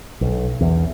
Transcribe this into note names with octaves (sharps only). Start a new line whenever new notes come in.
B1
E2